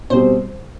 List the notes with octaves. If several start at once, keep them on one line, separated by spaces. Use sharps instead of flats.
B2 G3 C4 C5